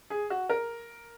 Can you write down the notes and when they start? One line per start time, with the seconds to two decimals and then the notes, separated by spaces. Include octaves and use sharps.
0.10 G#4
0.30 F#4
0.49 A#4